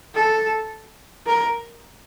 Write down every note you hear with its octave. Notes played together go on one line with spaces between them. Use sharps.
A4
A#4